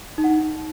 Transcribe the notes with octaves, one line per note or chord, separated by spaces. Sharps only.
D#4
F#5
D#4